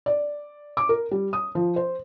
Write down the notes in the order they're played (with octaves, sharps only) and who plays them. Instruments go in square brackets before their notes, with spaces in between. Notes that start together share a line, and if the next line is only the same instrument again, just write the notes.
[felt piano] D5
D6
A#4
G3
D#6
F3
C5